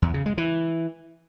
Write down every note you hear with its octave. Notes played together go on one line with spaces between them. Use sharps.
E2
C#3
G#3
E3